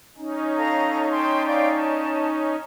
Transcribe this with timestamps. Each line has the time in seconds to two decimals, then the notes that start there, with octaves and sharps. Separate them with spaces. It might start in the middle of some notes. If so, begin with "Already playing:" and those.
0.18 C#4 D#4
0.56 A4 F5 A#5
1.10 G5 A5 C6
1.47 D5 F5 G5
1.76 A5